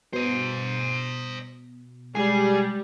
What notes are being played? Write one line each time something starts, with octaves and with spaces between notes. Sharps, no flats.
B2 C5 D#5
G3 G#3 G#4